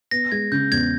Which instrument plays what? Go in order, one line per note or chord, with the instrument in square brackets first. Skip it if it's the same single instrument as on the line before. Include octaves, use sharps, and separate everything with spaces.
[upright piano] B3 [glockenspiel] A#6
[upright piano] G#3 [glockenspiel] G#6
[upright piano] C#3 [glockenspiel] G6
[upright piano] E2 [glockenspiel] G#6